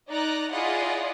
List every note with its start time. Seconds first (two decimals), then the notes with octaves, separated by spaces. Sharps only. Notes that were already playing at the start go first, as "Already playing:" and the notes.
0.10 D#4 D5 A#5 F#6
0.53 E4 F4 G#4 D5 D#5 F#5